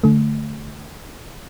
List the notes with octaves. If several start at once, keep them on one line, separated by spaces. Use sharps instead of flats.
D3 A3